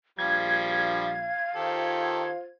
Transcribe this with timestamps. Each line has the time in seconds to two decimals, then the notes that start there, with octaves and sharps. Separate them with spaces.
0.19 A#1 F3 G3 F5 G#6
1.55 D#3 F4 G4 A4 C5